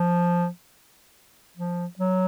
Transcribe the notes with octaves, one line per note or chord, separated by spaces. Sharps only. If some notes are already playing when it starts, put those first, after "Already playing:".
Already playing: F3
F3
F#3